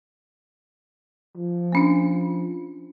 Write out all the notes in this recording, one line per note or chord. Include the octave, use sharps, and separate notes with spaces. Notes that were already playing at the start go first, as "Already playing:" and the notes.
F3
A#3 C#4 D4